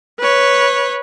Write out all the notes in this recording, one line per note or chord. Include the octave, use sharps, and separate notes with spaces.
B4 C#5